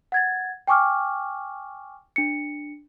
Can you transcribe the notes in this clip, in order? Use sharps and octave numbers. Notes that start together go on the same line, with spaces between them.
F#5 G#6 A6
G5 G#5 C#6 D6 F6
D4 C#7